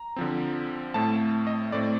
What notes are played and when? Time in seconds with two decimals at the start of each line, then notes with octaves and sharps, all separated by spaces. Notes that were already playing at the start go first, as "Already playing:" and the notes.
Already playing: A#5
0.16 D3 F3 C4
0.94 A2 A3 C4 A5
1.47 D#5
1.72 A2 A3 C4 D5